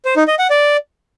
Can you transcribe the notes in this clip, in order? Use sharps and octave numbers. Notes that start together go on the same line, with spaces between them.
C5
D#4
D#5
F#5
D5